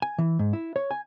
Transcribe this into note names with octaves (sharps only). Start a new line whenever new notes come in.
G#5
E3
G#2
E4
C#5
G#5